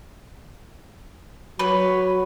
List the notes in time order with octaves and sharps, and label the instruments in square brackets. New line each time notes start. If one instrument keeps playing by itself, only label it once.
[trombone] F#3 [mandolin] B4 C#5